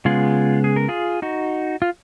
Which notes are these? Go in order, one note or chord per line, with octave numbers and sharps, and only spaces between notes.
C#3 G#3 B3 F4 G#4
G#4
A#4
F4 G#4
D#4 F#4
F4